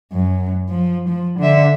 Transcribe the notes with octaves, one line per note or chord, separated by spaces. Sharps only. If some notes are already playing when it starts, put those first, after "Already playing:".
F#2
F3
F3
D3 E5